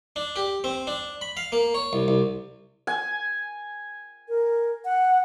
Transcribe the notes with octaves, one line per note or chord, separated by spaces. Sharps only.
D4
G4
C4
D4
B5
F5
A#3
C#5
C2
C2
G#5
A#4
F#5